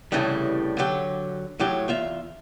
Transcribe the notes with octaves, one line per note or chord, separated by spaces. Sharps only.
C2 A2 C#3 E3 G3
D3 F#3 G4
A2 F#3 G4
E2 F4 E5